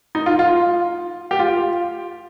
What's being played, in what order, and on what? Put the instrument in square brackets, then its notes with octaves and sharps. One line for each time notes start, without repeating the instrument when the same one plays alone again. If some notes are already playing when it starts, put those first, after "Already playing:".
[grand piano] D#4
F4
F4
G4
F4